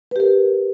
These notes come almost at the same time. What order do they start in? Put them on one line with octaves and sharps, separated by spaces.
B4 G4 A#4